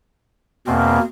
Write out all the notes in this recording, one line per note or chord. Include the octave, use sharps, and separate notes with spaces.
E2 B2 A#3 C4